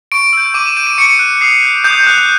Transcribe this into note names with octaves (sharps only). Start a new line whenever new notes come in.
C#6 D7
E6 G6
D6 D#7
E7
G6 D#7
D7
C#6 C#7
F#6
D#6 C7
G6
D#6 G6
F#6